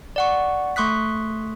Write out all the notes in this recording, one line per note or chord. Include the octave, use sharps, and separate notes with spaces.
D5 F#5 C#6
A3 C6 C#6 D#6 F#6 B6